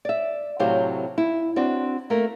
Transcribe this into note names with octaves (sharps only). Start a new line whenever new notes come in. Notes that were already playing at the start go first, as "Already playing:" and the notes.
D5 E5
A2 C3 F#3 G4 C5 F5
E4
C4 D4 F#4
A3 A#3 A#4